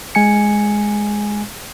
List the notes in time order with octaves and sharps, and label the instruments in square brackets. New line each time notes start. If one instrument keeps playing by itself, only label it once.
[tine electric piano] G#3 G#5 C#7